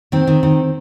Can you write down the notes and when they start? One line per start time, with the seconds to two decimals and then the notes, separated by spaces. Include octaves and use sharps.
0.12 D#3 C4
0.27 D#3
0.43 D#3